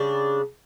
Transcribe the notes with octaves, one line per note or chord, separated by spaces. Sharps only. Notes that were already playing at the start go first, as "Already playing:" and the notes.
Already playing: C#3 G3 D4